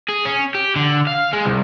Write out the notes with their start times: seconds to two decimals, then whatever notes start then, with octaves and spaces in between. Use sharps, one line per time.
0.09 G#4
0.25 C#4
0.55 G4
0.76 D3
1.07 F5
1.33 G#3
1.46 C2